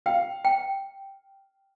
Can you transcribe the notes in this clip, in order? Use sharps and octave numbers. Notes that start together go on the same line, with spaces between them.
F5 G5
G5